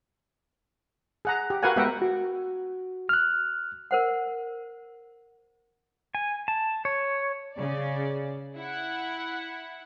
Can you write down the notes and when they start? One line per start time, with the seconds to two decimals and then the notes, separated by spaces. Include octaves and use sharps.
1.25 G#4 F#5 A#5
1.50 G4
1.63 F#4 A#4 B4 F5 F#5 G#5
1.76 G#3 B3 A#4 E5 F#5 G5
2.02 F#4
3.09 F6 F#6
3.91 A#4 C5 F#5
6.15 G#5
6.48 A5
6.85 C#5
7.56 C#3 D5
8.56 E4 F#5